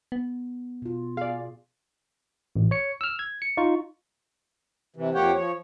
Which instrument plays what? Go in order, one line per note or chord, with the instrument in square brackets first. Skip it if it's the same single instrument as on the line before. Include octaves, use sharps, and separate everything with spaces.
[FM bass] B3
[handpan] B2 F4
[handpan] G#4 [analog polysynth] D5 F5
[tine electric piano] A1
C#5 C#7
E6 F6
G#6
C#7
D#4 F4 C#6
[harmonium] C3 E3
F2 A#3 G4 C#5 F#5 G5
F3 C#5